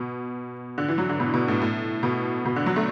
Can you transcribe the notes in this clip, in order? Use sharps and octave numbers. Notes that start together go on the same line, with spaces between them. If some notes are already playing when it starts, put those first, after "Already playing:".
Already playing: B2
D3
E3
F#3
D3
B2
B2
A2
A2
B2
B2
D3
F#3
A3